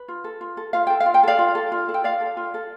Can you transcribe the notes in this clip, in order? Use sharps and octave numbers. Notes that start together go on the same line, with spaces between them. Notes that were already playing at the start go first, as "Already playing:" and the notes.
Already playing: B4
F4
A4
F4
A4
F4 F5
A4 G5
F5
F4
G5
A4 D5 F5
F4
A4
F4
A4
G5
F4 D5 F5
A4
F4
A4